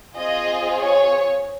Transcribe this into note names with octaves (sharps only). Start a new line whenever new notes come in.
C4 F4 G#4 D#5
C#5